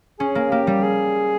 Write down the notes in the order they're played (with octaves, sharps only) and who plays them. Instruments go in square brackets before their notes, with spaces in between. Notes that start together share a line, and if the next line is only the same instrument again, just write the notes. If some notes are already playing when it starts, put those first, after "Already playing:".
[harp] C#4 [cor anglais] G#4
[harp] A#3
[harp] A#3 [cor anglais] G4
[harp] G3
[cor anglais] G#4